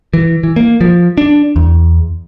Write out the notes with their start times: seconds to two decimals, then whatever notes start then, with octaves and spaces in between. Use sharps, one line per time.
0.13 E3
0.43 E3
0.56 A#3
0.81 F3
1.18 D4
1.56 E2